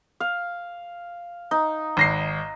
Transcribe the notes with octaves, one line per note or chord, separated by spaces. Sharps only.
F5
D#4
G#1 A#6 C7